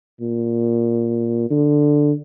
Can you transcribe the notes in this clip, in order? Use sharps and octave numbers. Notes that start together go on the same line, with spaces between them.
A#2
D3